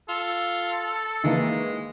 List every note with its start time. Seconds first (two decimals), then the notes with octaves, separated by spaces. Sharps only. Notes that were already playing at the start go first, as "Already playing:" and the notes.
0.09 F4 A4
1.24 D#3 E3 G#3 A#3